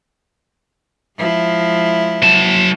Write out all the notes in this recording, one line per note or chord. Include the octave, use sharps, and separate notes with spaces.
F3 G#3 E4
F#3 A5